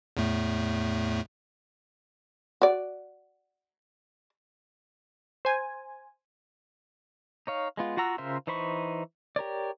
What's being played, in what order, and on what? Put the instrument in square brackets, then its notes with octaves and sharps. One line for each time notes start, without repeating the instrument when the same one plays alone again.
[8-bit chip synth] E2 A2 A3
[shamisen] F#4 D5
[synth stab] C5 G#5
[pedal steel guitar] D#4 C#5 F5
G#3 B3 F4
F4 F#4 F#5 A#5 E6
C#3 F4 A#4 C5 E5
E3 D#4 C5 B5 C#6
G4 A#4 C#5 D5